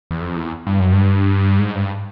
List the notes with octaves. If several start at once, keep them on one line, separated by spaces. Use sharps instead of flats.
E2
F2
E2
G2
F#2
G2
G#2
G2